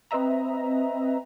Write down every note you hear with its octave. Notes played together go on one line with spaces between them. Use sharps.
C4 B4 D#5 E5 A#5